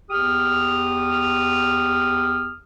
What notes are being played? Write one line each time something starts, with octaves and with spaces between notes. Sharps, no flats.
E2 G4 D#6 F6